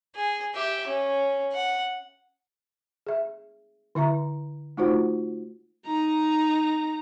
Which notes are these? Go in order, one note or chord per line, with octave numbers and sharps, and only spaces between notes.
G#4
G4 E5
C#4
F#5
G#4 E5
D3 E4 E5 A#5
A3 D#4 F4 F#4 C5 F#5
D#4 A#5